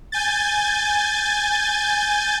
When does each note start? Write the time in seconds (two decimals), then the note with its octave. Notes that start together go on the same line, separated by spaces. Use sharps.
0.12 G#5 G6 A6